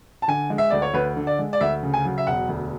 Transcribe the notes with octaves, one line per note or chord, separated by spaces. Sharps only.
A5
D3 G#5
G#3
E5
D2 D5
C#5
D2 B4
D3
D5
G#3
D5
D2 E5
C#3
G#5
F#3
E5
E1 F#5
D2